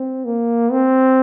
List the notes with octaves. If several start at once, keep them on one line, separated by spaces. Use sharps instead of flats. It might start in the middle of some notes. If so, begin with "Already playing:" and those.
Already playing: C4
A#3
C4